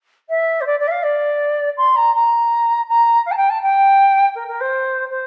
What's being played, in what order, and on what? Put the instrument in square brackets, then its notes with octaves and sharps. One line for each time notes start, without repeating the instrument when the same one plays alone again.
[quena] E5
C5
D5
D5
E5
F5
D5
C6
A#5
A#5
A#5
F5
A5
G5
A5
G5
A#4
A#4
C5
C5